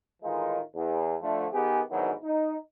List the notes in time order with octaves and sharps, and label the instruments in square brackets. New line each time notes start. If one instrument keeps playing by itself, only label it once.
[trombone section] A2 D#3 E3 G#3 D#4 F4
E2
D3 F3 A3
D#3 B3 G4 G#4
D2 G#2 D#3 E3 F#3 B3
D#4